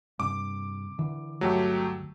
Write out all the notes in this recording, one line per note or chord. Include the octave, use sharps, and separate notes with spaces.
G2 C3 D6
D3 E3
G1 D2 F#3 A3 G4